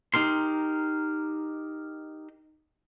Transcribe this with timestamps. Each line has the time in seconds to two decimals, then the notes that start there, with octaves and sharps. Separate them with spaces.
0.14 D#4 G4 A#4 C6